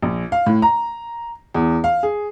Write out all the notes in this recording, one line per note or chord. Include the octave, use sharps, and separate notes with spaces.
A#1
F5
A2
A#5
E2
F5
G#4